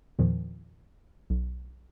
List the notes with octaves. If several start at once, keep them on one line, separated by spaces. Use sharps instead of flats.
E2 A#2 D#3 F3
B1